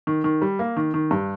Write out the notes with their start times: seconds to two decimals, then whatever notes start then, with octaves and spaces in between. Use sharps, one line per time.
0.07 D#3
0.24 D#3
0.42 G3
0.59 A#3
0.77 D#3
0.94 D#3
1.11 G2